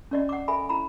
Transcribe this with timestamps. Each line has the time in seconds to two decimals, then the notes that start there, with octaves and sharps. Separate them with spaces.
0.11 C#4 D5 D#5
0.29 F#5 D6
0.48 A4 E5 G#5 B5
0.69 E4 A#5 B5